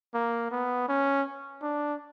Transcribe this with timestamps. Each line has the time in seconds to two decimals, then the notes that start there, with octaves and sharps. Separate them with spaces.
0.14 A#3
0.51 B3
0.89 C#4
1.62 D4